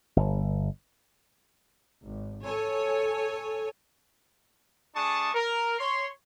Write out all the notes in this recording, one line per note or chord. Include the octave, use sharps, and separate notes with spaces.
G1
G#1
A4 C#5 G#5
A3 D4 G#4 A5 C#6 D#6
A#4
C#5 C6